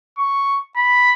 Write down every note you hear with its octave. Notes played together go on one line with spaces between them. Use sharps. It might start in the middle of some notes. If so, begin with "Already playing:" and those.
C#6
B5